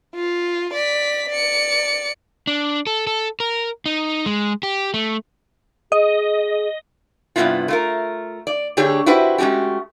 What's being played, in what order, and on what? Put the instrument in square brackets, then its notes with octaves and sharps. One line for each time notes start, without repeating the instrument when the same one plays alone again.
[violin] F4
D5 B6
D5 C#7
[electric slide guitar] D4
A4
A4
A#4
D#4
G#3
G4
A3
[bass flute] G#4 [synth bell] D#5
[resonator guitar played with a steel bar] G2 C3 D#3 B3 E4 F4
A3 F4 A#4
D5
D3 A3 G4 G#4 C#5
E4 F#4 G4 B4 C5
G#3 A3 C#4 F#4 G4